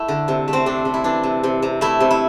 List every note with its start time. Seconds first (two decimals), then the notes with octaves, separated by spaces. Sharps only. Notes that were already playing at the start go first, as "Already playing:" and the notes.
Already playing: A3 E4
0.08 D3
0.28 C3
0.48 A3
0.53 C4
0.66 C3 D4
0.85 C3
0.94 E4
1.04 E3 D4
1.23 C3
1.43 C3
1.62 C3
1.81 A3 E4
2.00 C3
2.11 E4